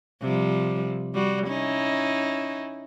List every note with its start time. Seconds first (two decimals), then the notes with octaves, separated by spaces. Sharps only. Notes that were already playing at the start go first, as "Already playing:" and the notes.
0.21 C3 F3 G3
1.14 G3 F#4
1.47 C#4 D#4 E4